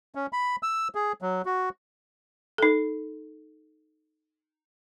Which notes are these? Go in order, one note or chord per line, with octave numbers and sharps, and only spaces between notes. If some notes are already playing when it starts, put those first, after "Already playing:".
C#4
B5
E6
G#4
F#3
F#4
D#4 A4